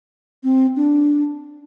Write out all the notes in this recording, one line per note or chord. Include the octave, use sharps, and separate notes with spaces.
C4
D4